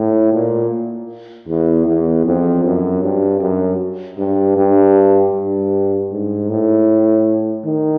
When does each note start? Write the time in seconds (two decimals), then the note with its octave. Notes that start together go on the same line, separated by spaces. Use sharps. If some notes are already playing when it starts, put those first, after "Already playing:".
Already playing: A2
0.33 A#2
1.48 E2
1.87 E2
2.26 F2
2.64 F#2
3.02 G2
3.41 F#2
4.18 G2
4.57 G2
5.34 G2
6.11 G#2
6.49 A2
7.65 D#3